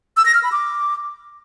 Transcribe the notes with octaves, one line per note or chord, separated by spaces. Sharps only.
E6
A#6
F6
B5
D6